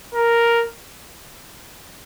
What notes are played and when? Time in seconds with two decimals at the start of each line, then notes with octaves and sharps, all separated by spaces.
0.15 A#4